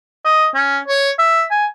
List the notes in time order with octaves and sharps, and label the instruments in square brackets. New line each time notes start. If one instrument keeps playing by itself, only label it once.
[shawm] D#5
C#4
C#5
E5
G#5